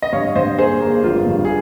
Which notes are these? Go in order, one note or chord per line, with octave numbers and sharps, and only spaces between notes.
D#5
G2 C#5 F5
G2 C5 D#5
A#3 G#4 C5
A#3
G1 F4
G2
G#4